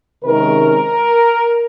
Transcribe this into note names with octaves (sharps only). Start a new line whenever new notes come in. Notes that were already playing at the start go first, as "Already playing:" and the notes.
C3 D#3 G#3 C#4 A#4